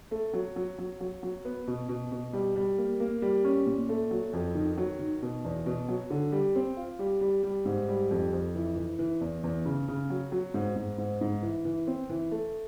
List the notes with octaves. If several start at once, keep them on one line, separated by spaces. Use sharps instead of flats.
A3
F#3
F#3
F#3
F#3
F#3
B3
B2
B2
B2
G3
G3
A#3
A#3
G3
C#4
A#2
A3
F#3
F2
D#3
F#3
D#3
B2
E2
B2
F#3
D3
G3
C4
F4
G3
G3
G3
G#2
G3
F2
F2
E3
E3
E3
E2
E2
C#3
C#3
F#3
F#3
G#2
G#2
G#2
G#2
E3
E3
C4
E3
A3